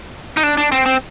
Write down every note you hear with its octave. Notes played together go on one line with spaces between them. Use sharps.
D#4
D4
D4
C4
C4